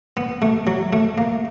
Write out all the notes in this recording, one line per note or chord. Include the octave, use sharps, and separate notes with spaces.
B3
A3
F#3
A3
A#3